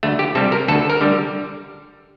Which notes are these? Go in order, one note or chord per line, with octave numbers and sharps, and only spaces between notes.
D2 A3
G4
C3 G3 A4
A#4
D2 A4
A#4
D3 G3